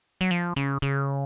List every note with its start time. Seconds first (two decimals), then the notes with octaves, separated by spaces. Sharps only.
0.21 F#3
0.31 F3
0.56 C#3
0.82 C#3